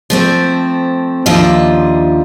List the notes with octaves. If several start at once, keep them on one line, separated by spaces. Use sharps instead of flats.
F3 A3 C4
D#2 F3 D4 F4 D#5 E5